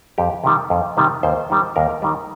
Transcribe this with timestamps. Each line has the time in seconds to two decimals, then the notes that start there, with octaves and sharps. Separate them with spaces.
0.18 F2 G4
0.44 C3 D#3 G3
0.70 F2
0.97 C3 D#3 G3
1.23 D#2 C5
1.50 D#3 G3
1.76 D#2 A#4
2.02 D#3 G3